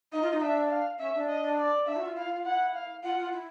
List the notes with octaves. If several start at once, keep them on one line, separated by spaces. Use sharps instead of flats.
D#4 D#5
F4
D#4
D4 E5
F5
C#4 E5
D4
D#5
D5
D4 E5
F#4
F4
E4 F5
F4
F4
E4 F#5
F5
F4 F#5
F4
E4